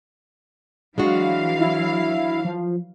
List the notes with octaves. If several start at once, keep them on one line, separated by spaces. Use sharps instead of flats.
E3 F#3 G#3 D4 F#4 F5
E4
F3